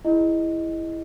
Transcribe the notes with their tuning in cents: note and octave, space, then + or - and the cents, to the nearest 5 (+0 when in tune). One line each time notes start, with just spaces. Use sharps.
E4 +0 G#4 +0 D#5 +0